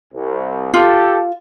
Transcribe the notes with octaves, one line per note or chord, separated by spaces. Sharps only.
C2
F4 G4 A4